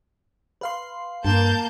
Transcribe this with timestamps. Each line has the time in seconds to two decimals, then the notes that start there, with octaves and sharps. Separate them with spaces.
0.61 B4 F5 C6
1.25 G2 A#3 A5 G6